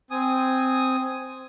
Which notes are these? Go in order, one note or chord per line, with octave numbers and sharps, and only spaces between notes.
C4 G#5 D#6